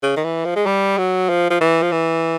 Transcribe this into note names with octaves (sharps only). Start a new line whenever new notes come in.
C#3
D#3
E3
F3
G#3
G3
F#3
F3
F3
E3
F3
E3